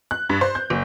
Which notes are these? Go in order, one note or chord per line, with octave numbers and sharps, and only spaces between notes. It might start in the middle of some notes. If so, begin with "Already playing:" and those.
F#6
G2
C5
G6
F#1